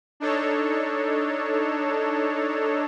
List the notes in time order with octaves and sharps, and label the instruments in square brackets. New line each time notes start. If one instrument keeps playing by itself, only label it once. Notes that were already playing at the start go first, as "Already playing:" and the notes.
[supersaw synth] D4 D#4 A4 C#5